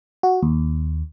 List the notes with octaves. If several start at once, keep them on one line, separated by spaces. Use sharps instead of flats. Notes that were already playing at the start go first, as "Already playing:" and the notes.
F#4
D#2